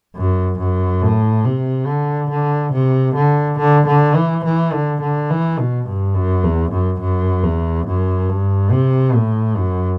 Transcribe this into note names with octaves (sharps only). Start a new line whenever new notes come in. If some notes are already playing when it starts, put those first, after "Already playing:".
F#2
F#2
A2
C3
D3
D3
C3
D3
D3
D3
E3
E3
D3
D3
E3
B2
G2
F#2
E2
F#2
F#2
E2
F#2
G2
C3
A2
F#2